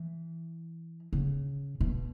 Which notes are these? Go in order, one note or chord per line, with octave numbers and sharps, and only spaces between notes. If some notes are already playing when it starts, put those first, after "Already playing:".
Already playing: E3
C#3
B2